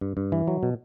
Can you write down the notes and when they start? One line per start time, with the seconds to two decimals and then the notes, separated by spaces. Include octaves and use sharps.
0.01 G2
0.17 G2
0.32 E3
0.48 F#3
0.63 B2